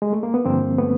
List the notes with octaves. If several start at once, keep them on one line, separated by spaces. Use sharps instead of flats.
G#3
A3
A#3
B3
G2 D3 F3 A#3 C4
A3 B3